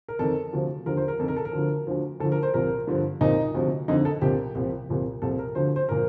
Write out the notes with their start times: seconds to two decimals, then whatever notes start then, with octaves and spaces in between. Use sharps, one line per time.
0.09 A#4
0.19 F2 D#3 A4
0.53 D2 C3 F3
0.86 D#2 D3 F3 A#4
0.97 C5
1.08 A#4
1.19 F2 D#3 A4
1.28 A#4
1.37 A4
1.45 A#4
1.53 D2 D3 F3
1.87 D2 D3 F3
2.20 D2 D3 F3 A4
2.32 A#4
2.43 C5
2.54 C2 A#2 F3 A#4
2.87 G2 D3 F3
3.21 C2 A#2 F3 D#4
3.55 D2 C3 F3
3.88 F2 D3 F3 D#4
4.05 A4
4.21 C2 A#2 F3 G4
4.55 C2 A#2 F3
4.89 C2 A#2 F3
5.22 C2 A#2 F3 A4
5.39 A#4
5.55 D2 D3 F3 C5
5.76 C5
5.89 A#2 F3 A#4